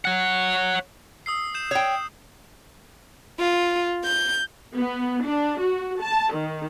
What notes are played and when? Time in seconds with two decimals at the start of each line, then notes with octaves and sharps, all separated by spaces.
0.05 C#5 F#5
1.26 D#6 E6 C7
1.55 G6 E7
1.71 C#5 G5
3.40 F4
4.05 G6
4.75 B3
5.24 D4
5.60 F#4
6.01 A5
6.33 D#3